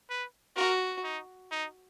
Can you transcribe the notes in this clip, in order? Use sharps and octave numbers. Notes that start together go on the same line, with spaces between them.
B4
F#4 A#4
D#4
D#4